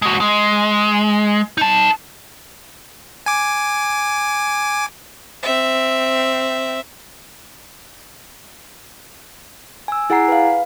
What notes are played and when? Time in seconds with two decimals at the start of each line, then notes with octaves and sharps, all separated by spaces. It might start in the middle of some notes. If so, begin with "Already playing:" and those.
0.02 G#3 F#4
0.20 G#3
1.58 D#4 A5
3.26 G#5 D6
5.43 C4 E5
9.88 G#5 E6
10.10 E4 G#4 F#5 G#5 A#5 C7
10.28 B4 F5